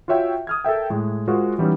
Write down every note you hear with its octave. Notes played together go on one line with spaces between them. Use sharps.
F4 F#4 C#5 E5 G5
D#6 F6 G#6
A4 A#4 E5 G5
A2 G#3
G#3 F4 F#4 A#4 C5 D#5
E3 G3 B3 C#4 D#4